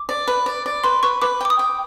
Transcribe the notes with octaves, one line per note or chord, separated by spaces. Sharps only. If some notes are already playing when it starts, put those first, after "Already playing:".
Already playing: D6
D5
B4
D5
D5
B4 C6
B4 C#6
B4 D6
G5 D6
D#6
G5